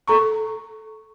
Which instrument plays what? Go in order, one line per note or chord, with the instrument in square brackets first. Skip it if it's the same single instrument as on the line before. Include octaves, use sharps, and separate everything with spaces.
[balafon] A4 A#5 C#6